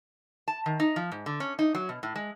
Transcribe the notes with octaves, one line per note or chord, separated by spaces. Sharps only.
A5
D#3
D#4
F3
G#2
D3
C#4
D#4
F#3
B2
A2
G#3